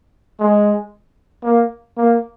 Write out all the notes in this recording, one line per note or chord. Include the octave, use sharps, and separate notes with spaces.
G#3
A#3
A#3